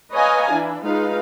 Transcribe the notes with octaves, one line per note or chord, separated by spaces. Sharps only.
B4 C#5 D#5 F5 G#5 A#5
E3 D4 E4
G#3 D#4 F4 B4 F5